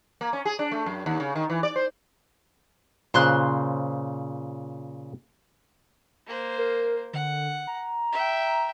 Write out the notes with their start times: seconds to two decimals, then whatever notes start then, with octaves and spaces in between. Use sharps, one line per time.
0.21 A#3
0.33 C#4
0.45 G#4
0.59 D4
0.71 A3
0.86 F#2
1.06 D#2
1.20 C#3
1.35 D#3
1.50 E3
1.63 D5
1.76 C5
3.14 A#2 C#3 C5 C6 F#6
6.27 A#3 C5
6.58 A#4
7.14 D3 F#5
7.67 A#5
8.12 E5 G5